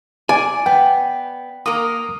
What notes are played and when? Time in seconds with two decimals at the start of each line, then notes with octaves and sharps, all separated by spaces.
0.29 D5 G#5
0.66 B3 G5
1.66 A#3 A#4 D#6